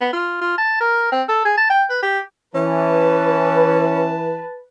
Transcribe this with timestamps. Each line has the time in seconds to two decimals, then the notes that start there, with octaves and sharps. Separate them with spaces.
0.01 B3
0.13 F4
0.41 F4
0.58 A5
0.81 A#4
1.12 C4
1.29 A4
1.45 G#4
1.57 A5
1.70 G5
1.89 B4
2.03 G4
2.55 E3 C#4 B4 A5